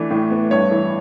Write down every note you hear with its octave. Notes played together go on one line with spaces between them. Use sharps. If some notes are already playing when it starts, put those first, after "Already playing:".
Already playing: E3 A3 D4
A2
B3
G2 C#5
E3